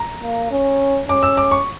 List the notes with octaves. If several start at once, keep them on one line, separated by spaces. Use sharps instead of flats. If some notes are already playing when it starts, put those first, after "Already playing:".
Already playing: A#5
A#3
C#4
C#4 D6
E6
D6
C#6